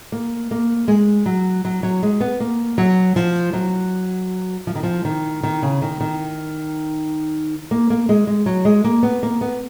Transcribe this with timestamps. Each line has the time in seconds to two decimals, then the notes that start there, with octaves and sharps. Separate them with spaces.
0.12 A#3
0.51 A#3
0.88 G#3
1.26 F#3
1.65 F#3
1.83 F#3
2.03 G#3
2.21 B3
2.40 A#3
2.78 F#3
3.16 F3
3.53 F#3
4.67 F3
4.75 D#3
4.83 F3
5.05 D#3
5.43 D#3
5.62 C#3
5.82 D#3
6.01 D#3
7.71 A#3
7.90 A#3
8.09 G#3
8.27 G#3
8.46 F#3
8.65 G#3
8.84 A#3
9.03 B3
9.23 A#3
9.41 B3